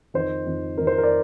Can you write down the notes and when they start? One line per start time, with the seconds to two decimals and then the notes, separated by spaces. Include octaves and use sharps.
0.14 F2 D#3 C5
0.46 F2 D#3
0.78 F2 D#3 A#4
0.87 C5
0.98 A#4
1.03 D5